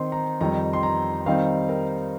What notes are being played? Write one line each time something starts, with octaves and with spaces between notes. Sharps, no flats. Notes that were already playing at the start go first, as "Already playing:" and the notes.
Already playing: D#3 C4 D#4 C6
A#5
F2 D#3 G3 D#4 A#5
C6
A#5
D#3 G3 C4 D#4 F5
A#4